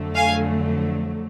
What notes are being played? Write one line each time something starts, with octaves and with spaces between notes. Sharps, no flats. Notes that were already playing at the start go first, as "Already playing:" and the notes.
Already playing: F2 D3 F#3 A3
F5 G#5